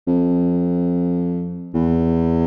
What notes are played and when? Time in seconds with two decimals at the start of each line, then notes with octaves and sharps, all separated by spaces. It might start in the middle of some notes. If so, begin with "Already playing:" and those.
0.07 F2
1.74 E2